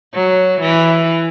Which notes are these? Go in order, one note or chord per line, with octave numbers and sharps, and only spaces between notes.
F#3
E3